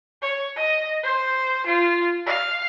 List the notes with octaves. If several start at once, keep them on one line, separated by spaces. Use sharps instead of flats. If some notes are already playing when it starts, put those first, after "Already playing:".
C#5
D#5
C5
F4
F5